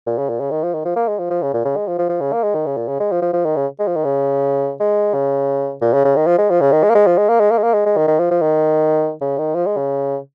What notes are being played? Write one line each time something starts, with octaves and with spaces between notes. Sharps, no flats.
A#2
C#3
A#2
C#3
D#3
F3
D#3
F3
A#3
G#3
F3
F3
C#3
A#2
C#3
G#3
F3
F3
F3
C#3
A#3
G#3
D#3
C#3
A#2
C#3
G#3
F3
F3
F3
D#3
C#3
G#3
F3
D#3
C#3
G#3
C#3
A#2
C#3
C#3
D#3
F3
G#3
F3
C#3
D#3
G#3
A#3
G#3
F3
G#3
A#3
G#3
A#3
G#3
A#3
G#3
G#3
D#3
D#3
F3
F3
D#3
C#3
D#3
F3
G#3
C#3